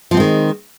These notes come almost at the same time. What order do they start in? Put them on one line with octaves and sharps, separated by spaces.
F3 C4 G#3 D#3